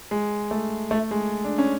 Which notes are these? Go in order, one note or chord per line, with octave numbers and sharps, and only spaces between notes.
G#3
A3
A3
G#3
D4
C#4